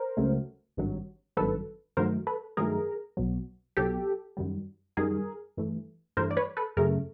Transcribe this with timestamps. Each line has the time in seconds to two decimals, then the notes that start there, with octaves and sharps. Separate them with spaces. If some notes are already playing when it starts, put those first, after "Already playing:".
Already playing: A#4 C5
0.17 C#2 C#3 F#3 A3
0.77 G#1 G2 D#3 F#3
1.37 G#1 G2 D#3 F#3 A4 B4
1.97 G2 D#3 F#3 A3 A#4 C5
2.27 A4 B4
2.57 G2 D#3 F#3 A3 G#4 A#4
3.17 B1 B2 F#3
3.77 B1 B2 F#3 G4 A4
4.37 F#2 D#3 G3
4.97 F#2 D#3 G3 G#4 A#4
5.57 G2 E3 A3
6.17 G2 E3 A3 A#4 C5
6.31 D5
6.37 B4 C#5
6.57 A4 B4
6.77 F#2 C#3 F#3 A3 G#4 A#4